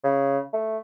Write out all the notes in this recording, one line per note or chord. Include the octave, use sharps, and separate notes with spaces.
C#3
A3